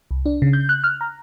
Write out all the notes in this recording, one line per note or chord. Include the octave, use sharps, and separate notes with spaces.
C2
D4
C#3
G6
F#6
F6
A#5